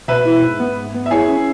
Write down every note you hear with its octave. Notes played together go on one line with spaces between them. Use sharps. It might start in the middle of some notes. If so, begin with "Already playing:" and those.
B2 B4 E5
E4
G#2
B3
G#2
B3
E5
E4 G#4 C#5
C#4